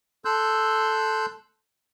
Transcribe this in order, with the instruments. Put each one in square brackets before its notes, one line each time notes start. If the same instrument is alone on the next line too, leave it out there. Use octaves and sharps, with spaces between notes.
[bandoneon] A4 C6 E6 F#6 G6